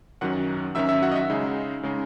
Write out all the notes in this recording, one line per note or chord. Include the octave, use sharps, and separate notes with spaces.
F#2 D#3 F#3 C#4 F#5 F#6
F#2 D#3 F#3 C#4 E5 E6
E5 E6
F#4 F#5
D#5
E5
C#3 G#3 D#4
C#3 G#3 D#4